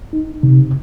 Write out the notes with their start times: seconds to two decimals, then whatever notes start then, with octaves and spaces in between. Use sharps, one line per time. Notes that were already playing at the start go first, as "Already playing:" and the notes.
0.13 D#4
0.43 C3